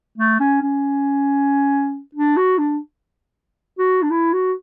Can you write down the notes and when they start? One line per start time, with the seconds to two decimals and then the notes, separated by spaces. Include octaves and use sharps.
0.18 A3
0.40 C#4
0.62 C#4
2.15 D4
2.37 F#4
2.58 D4
3.78 F#4
4.02 D4
4.11 E4
4.33 F#4